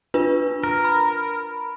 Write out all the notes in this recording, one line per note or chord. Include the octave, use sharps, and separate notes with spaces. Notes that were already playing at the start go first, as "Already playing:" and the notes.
D4 F4 B4
A#4
B5